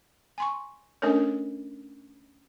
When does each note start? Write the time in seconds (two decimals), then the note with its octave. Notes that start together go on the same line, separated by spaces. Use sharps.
0.38 G#5 C6 C#6
1.02 A3 C#4 D4 A4 A#4 C#5